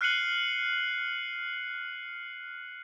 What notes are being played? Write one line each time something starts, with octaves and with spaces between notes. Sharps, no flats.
F6 F#6 C7 C#7 D#7 F#7